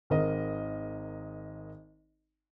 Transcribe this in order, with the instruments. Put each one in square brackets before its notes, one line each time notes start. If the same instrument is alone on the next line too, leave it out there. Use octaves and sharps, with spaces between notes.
[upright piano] G#1 A#4 D#5